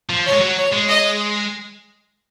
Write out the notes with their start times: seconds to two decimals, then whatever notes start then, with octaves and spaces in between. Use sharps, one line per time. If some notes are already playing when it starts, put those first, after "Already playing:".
0.09 F3
0.26 C#5
0.32 G#3
0.41 F#3
0.58 C#5
0.73 G#3
0.88 D#5